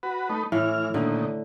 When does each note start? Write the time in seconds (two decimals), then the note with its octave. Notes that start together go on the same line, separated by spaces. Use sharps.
0.03 F#4 B4
0.29 A3 D#4 B4
0.52 A2 E3 F6
0.94 A#2 D3 D#3